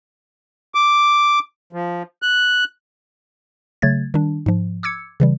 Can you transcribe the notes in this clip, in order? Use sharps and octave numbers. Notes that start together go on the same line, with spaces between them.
D6
F3
F#6
C#3 F#3 A3 G#6 A6
D#3 G3 D4
G#2 F3
D6 E6 G#6 C#7
C#3 E3 G3